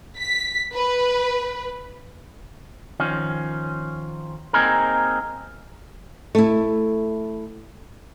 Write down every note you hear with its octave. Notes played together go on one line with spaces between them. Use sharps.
B6
B4
D#3 F3 C#4
A#3 C4 D#4 G#4 A#4
A3 E4